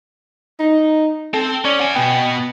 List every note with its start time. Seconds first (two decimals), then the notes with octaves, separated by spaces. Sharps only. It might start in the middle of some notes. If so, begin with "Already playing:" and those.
0.60 D#4
1.34 C4 A4
1.65 C#4 D5
1.79 F#5 G#5
1.95 B2 B3 G5